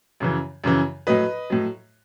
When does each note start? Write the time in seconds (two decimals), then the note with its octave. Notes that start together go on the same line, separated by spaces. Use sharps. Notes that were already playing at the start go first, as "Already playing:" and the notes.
0.20 F#2 C#3 E3
0.64 F#2 C#3 E3
1.07 A2 F#3 B4 D#5
1.50 A2 F#3